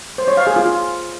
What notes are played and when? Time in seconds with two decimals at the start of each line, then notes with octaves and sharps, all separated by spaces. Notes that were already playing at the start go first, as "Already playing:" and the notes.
0.18 C5
0.28 C#5
0.37 F5
0.47 G#4
0.56 F4